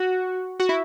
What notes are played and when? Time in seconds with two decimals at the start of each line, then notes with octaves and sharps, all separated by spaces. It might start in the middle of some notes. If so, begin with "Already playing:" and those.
Already playing: F#4
0.60 F#4
0.69 E4